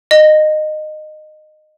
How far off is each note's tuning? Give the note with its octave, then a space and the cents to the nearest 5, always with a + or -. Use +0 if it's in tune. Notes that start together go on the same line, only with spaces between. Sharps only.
D#5 -20